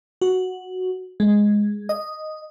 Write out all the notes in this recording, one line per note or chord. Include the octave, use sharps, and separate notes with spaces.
F#4
G#3
D#5